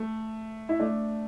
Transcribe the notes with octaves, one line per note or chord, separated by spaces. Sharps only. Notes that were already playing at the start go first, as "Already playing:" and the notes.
Already playing: A3
E4
A3 D4